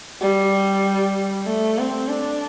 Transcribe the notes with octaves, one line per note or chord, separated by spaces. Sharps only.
G3
A3
C4
D4